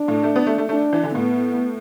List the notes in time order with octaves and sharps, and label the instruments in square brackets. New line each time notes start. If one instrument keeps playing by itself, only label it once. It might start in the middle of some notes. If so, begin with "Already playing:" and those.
Already playing: [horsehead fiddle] D4
[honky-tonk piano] A2
A3
B3
A3
A3
[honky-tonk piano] A3 [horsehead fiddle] D4
[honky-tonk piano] E3
D3
[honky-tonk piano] A2 [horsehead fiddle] B3